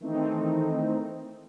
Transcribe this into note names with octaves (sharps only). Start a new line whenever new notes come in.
D#3 E3 A3 C4 D#4